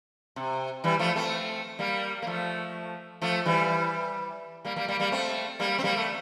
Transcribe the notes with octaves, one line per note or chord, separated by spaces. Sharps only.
C3
E3 G3
F3 A3
A3 C4
G3 A#3
A#3
F3 A3
F3 A3
E3 G3
G3 A#3
G3 A#3
G3 A#3
G3 A#3
A3 C4
G3 A#3
C4
G3 A#3
A3